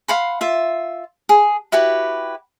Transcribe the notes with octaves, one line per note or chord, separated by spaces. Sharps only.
F5 F#5 B5 C6
F4 E5
G#4
E4 F#4 G4 B4